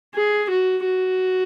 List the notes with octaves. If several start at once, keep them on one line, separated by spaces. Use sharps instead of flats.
G#4
F#4
F#4